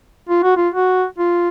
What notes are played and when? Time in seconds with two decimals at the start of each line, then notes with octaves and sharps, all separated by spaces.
0.29 F4
0.43 F#4
0.57 F4
0.74 F#4
1.18 F4